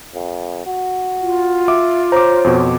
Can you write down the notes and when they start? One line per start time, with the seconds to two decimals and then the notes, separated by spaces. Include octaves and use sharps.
0.14 F2
0.66 F#4
1.21 F4
1.68 E5 D6
2.12 C5 C#5 A#5 D6
2.44 F2 B2